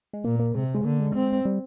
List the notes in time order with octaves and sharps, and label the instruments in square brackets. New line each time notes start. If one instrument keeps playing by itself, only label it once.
[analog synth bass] G#3
[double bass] A#2 [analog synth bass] A#3
[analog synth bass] A#3
[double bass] C3 [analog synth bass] G#3
[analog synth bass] G#3
[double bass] D3 [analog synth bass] A#3
[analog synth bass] G#3
[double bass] C4
[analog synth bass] G3